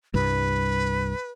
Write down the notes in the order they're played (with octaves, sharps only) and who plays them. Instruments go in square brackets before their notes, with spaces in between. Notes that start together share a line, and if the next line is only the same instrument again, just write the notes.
[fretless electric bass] C2 G2 [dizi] B4